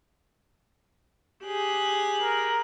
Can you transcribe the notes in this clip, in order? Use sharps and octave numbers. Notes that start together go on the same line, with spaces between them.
G4 G#4 F#6
A#4